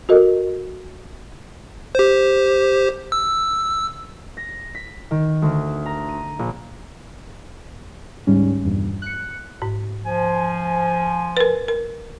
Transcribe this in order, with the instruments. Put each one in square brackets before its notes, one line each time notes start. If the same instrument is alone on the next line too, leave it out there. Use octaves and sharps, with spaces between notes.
[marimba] F#4 A4 A#4 D#5
[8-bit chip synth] G4 C5
E6
[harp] A#6
B6
D#3
D2
A#5
D#7
A#1
[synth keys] D2 G#2 G3 C#4
G#1 E2 G2 A#2
F#6 C#7
[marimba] G#2
[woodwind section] F3 G#5
[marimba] A#4 B4
A#4